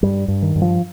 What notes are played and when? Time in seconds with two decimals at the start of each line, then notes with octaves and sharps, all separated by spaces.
0.03 G2 G3
0.28 G2
0.42 D#3
0.56 G2
0.62 F3